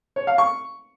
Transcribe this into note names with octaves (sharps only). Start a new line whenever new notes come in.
C#5
F5
C#6